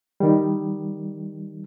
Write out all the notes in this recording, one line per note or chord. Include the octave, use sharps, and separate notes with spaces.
D#3 G3